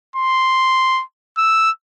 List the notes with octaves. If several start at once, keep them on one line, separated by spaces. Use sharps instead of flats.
C6
E6